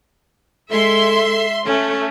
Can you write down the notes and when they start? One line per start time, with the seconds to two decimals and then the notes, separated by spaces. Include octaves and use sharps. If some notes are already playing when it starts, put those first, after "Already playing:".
0.70 G#3 A4 E5 C6
1.65 A3 C#4 A4